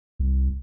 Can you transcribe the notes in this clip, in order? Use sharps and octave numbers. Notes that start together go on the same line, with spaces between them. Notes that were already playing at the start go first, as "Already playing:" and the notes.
C2